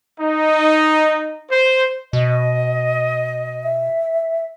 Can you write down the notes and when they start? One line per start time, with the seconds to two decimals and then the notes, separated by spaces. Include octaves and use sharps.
0.19 D#4
1.51 C5
2.13 B2 D#5
3.64 E5